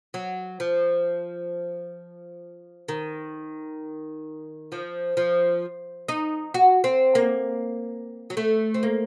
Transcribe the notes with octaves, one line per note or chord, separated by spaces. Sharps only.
F#3
F3
D#3
F3
F3
D#4
F#4
C4
A#3
F#3
A3
C4
A#3